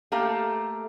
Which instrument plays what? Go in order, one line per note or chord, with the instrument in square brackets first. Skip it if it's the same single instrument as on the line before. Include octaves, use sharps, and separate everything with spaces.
[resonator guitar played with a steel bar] A3 A#3 G4 F5